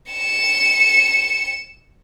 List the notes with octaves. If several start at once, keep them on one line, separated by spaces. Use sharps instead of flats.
C#7 E7